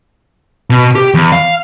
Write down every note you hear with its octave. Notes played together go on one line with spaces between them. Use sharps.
B2
G4
E2
F5